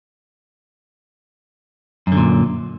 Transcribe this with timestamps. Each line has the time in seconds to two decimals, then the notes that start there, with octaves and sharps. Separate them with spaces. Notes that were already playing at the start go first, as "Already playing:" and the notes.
2.07 F#2
2.12 D3
2.17 A#2